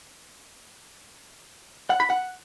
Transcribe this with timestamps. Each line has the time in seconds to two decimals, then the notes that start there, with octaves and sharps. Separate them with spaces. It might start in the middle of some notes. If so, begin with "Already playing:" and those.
1.90 F#5
2.00 B5
2.10 F#5